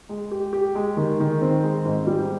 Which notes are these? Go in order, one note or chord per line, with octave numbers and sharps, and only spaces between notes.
G#3
G4
G4
G#3
D#3
D#3
C4
G#3
G#2
G3